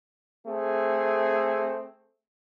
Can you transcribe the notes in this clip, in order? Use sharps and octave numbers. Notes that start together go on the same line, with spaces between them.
A3 C4 G#4